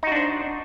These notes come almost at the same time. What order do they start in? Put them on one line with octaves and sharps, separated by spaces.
D#4 F#4 D4 C5